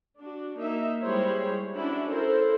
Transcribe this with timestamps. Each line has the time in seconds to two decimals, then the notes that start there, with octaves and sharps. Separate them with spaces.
0.18 D4 F#4
0.58 A#3 D#4 E5
1.03 G3 G#3 E4 C5 C#5
1.75 C#4 D4 E4 F#4
2.11 E4 A4 A#4 C5